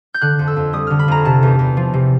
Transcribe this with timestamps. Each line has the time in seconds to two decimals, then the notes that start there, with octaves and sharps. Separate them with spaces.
0.14 G6
0.21 D3 F#6
0.39 F2
0.48 E6
0.56 F2
0.73 G3 D#6
0.87 D3 F6
0.99 B5
1.08 F2 A#5
1.25 C3 A5
1.43 E2
1.59 E2
1.77 F3
1.93 C3